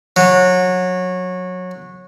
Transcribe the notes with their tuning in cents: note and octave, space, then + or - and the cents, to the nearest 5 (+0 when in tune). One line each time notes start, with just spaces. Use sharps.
F#3 -20